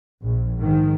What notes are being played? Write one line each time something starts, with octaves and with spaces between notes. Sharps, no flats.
A#1
G#2 D#3